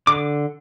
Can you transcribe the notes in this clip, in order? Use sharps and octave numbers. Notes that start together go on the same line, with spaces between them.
D3 D6